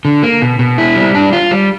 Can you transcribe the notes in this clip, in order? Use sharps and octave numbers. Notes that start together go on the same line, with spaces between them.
D3
A#3
B2
B2
E4
G3
D4
F4
G3